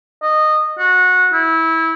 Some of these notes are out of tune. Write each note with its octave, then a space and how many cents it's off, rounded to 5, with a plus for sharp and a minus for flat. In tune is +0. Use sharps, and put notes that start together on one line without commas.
D#5 -15
F#4 -20
E4 -20